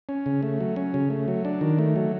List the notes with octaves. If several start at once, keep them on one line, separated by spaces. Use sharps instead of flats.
C#4
C#3
A3
F#3
C#4
C#3
A3
F#3
D4
D#3
A3
F#3